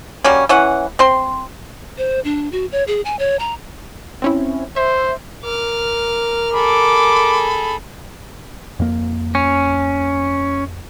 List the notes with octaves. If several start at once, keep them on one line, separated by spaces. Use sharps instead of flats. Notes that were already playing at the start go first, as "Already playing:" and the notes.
F#3 G3 A#3 C#4
E3 C#4 F#5
C4 C6
C5
D4
F#4
C#5
G#4
G#5
C#5
A#5
C4 C#4 E4
C5 E5
A#4 D6 F6
G#4 A4 B5 D6
F2 A#3
C#4